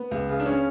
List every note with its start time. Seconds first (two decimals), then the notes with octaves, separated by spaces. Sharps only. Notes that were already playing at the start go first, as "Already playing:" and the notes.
Already playing: B3
0.11 C#2
0.29 C#3
0.40 D4
0.46 C#4